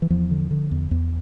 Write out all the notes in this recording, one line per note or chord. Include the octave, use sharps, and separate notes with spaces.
E3
E2 F3
D3
D3
E2
E2